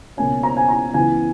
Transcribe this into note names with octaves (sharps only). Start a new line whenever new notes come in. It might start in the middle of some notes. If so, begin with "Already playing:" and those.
C#2 B2 A#3 C#4 G#5
A#5
G#5
A#5
C#2 C#3 E3 B3 G#5